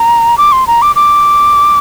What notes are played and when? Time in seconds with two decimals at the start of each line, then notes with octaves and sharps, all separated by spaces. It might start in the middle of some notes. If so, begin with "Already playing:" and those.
Already playing: A#5
0.38 D6
0.52 C6
0.67 A#5
0.82 D6
0.96 D6